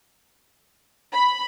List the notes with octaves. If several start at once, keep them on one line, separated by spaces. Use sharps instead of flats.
B5